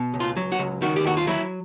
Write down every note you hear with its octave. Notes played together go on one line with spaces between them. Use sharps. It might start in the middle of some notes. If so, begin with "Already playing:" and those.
Already playing: B2
C#2
F4
F#3
F#4
C#2
D#3 F#4
G4
D#2 F#4
F4
F#3 E4